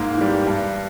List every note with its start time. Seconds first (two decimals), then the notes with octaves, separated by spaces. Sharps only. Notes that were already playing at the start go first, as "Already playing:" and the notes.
Already playing: G#2 A#3
0.16 E3 G3
0.47 G2